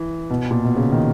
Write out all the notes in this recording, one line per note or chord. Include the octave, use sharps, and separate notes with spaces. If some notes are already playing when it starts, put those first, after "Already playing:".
Already playing: E3
B2
A#2
B2
C#3
D#3